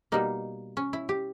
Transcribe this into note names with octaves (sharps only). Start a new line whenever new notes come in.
B2 G3 A#3 D#4
C#4
E4
G4